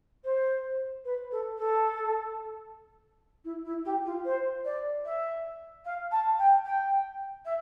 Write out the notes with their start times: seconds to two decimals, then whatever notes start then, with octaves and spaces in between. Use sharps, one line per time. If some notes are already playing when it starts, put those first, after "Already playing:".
0.24 C5
1.05 B4
1.31 A4
1.58 A4
3.44 E4
3.65 E4
3.85 G4
4.05 F4
4.25 C5
4.65 D5
5.05 E5
5.85 F5
6.11 A5
6.38 G5
6.65 G5
7.45 E5